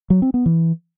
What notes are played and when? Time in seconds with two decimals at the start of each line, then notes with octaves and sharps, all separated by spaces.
0.10 F#3
0.22 C4
0.34 B3
0.46 E3